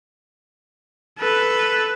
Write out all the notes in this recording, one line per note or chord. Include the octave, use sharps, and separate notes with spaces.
A4 B4